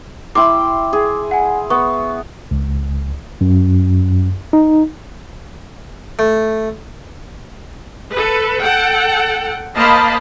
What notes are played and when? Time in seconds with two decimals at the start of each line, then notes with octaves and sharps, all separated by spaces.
0.35 E4 G5 C6 D6
0.93 G#4
1.31 F#5 G#5
1.70 B3 C#6
2.51 C#2
3.41 F#2
4.53 D#4
6.19 A3
8.11 A4 B4
8.60 A4 F#5 G5
9.75 A#3 C5 D#5 F5 A5 B5